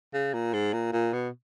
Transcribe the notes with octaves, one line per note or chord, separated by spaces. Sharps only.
C#3
A#2
G#2
A#2
A#2
B2